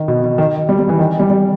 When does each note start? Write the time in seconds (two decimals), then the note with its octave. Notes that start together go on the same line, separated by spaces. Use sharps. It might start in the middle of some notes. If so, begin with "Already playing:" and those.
Already playing: D#3
0.08 B2
0.24 B2
0.38 D#3
0.69 G3
0.79 G3
0.89 E3
0.99 D#3
1.19 G3
1.30 G3